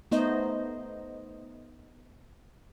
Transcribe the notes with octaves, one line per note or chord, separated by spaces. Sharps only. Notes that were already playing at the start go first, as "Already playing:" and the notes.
A3 B3 D#4 C5 D#5